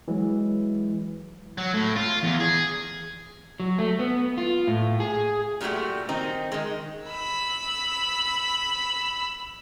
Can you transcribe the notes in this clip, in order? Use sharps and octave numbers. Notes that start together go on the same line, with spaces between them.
E3 F#3 G#3
F#3
A2
F4
E2
G#4
F#3
A3
B3
F4
A2
G#4
A#2 F#3 G3 A3 F#4
D#3 C4 D#4
D#3 G#3
B5 E6